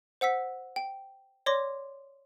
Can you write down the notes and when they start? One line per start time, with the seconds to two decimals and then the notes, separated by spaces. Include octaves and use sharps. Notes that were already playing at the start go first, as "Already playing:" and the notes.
0.21 C5 F#5 E6 B6
0.76 G5
1.46 C#5 D5 C6 D6 A#6